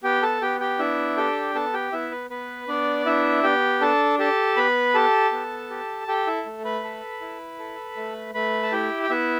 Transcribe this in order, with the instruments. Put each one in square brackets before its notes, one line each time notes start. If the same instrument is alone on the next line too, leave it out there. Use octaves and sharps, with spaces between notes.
[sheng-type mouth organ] B3 G4 G5
A4 A5
B3 G4 G5
G4 G5
D4 E4 E5
G4 A4 G5
B3 A4 A5
G4 G5
B3 E4 E5
B4
B3 B4
B3 D4 D5
D4 E4 E5
B3 G4 G5
D4 A4 A5
G4 A4 A5
B3 B4 B5
G4 A4 A5
B3
G4
G4 A4 G5
E4 E5
A3
B4 B5
A4
E4
A4
A3
A3 B4 B5
A5
E4 G4 G5
G5
B3 E4 E5